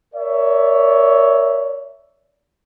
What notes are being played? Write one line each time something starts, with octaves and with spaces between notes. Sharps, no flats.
A#4 C#5 D5 E5